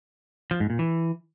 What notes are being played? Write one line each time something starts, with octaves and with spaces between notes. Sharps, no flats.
F3
G#2
A#2
E3